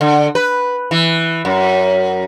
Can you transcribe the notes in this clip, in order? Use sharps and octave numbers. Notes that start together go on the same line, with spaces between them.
D3
B4
E3
F#2